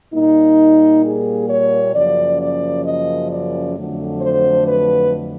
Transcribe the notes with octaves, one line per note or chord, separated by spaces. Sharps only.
A#2 G3 A#3 D#4
G#4
C#5
F#2 C#3 F3 A#3 D5
D5
D#5
D5
F2 D3 F#3 A3
C5
B4